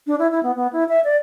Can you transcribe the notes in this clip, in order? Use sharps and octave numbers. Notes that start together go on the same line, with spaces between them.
D4
E4
E4
B3
B3
E4
E5
D5